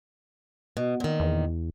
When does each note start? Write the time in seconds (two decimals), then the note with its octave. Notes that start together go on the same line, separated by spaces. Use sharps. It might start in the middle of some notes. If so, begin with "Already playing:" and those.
0.77 B2
1.00 A#2 D#3
1.20 E2